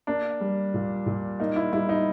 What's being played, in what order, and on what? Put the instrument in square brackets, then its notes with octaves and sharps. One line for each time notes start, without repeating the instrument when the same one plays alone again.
[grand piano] A#3 [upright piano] D4
[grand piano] G3
A#2
A#2
[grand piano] A#3 [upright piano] D#4
[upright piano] E4
[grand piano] G3 [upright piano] E4
[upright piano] D#4